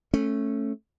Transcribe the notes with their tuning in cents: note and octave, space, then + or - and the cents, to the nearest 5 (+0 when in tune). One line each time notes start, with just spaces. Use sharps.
A3 +0 C#4 -15